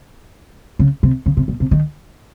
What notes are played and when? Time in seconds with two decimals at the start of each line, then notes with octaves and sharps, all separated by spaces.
0.79 C#3
1.03 C3
1.26 C#3
1.37 C3
1.48 A#2
1.60 C3
1.71 D#3